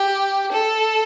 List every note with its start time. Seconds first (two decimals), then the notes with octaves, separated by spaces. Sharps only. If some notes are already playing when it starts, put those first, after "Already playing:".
Already playing: G4
0.52 A4